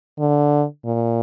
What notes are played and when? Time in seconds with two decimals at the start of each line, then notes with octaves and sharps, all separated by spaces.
0.19 D3
0.85 A#2